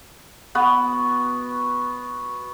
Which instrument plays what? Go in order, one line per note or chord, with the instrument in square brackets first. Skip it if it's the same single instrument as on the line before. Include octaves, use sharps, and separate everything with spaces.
[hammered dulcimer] B3 F#4 B4